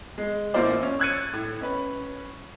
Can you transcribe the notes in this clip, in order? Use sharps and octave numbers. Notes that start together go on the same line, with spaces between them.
G#3
A1 A#3 E4 F4 C5 D5
C#4
E6 F#6 G#6 A6 C#7 D#7
A2
C#4 B4